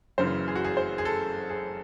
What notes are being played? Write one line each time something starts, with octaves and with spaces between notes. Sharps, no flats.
F#1 F#2 C#3 E3 C5
G#4
F#4
G#4
C5
G#4
A4
G#4